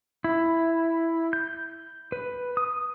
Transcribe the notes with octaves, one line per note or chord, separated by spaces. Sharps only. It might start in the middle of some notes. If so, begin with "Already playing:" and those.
E4
G6
B4
D#6